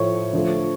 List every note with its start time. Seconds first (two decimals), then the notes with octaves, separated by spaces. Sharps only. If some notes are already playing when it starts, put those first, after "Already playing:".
Already playing: A2 F3 A3 C#5 C#6
0.33 D3 F3 A3